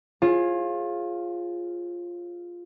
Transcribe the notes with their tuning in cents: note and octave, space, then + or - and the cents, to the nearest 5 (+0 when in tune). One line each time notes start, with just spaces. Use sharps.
F4 +0 G#4 +0 C5 +45